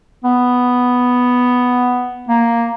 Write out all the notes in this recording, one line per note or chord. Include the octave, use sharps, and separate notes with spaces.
B3
A#3